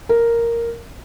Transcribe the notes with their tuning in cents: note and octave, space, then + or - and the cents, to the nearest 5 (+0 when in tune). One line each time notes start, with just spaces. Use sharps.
A#4 -5